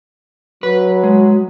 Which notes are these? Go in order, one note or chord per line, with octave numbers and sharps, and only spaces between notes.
F#3 B4
G#3